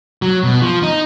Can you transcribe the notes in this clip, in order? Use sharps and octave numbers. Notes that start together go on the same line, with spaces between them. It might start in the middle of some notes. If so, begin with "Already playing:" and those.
F#3
B2
F3
D#4